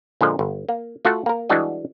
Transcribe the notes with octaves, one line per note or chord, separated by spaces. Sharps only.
A#2 D3 F3 G#3
G1
A#3
A3 F4 F#4 A4 F#5
A#3 A#4
E3 G3 G#3 D4 F#4 D#5